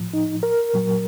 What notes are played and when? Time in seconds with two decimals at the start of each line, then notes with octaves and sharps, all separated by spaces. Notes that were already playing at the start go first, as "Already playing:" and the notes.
Already playing: A2 F3
0.13 D#4
0.43 A#4
0.74 A#2 F#3